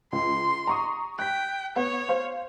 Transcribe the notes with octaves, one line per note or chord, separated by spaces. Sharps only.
C#2 C6
A#5 C#6 D#6
G5 F#6 B6
B3 C#5
C5 F5